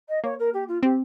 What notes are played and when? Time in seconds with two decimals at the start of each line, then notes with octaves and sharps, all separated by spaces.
0.09 D#5
0.24 A#3 C#5
0.39 A#4
0.53 G4
0.68 F4
0.83 C4 G4